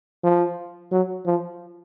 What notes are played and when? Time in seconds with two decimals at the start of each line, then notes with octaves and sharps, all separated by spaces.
0.24 F3
0.92 F#3
1.26 F3